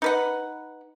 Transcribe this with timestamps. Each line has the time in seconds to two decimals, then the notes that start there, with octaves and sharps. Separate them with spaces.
0.02 D#4 B4 F#5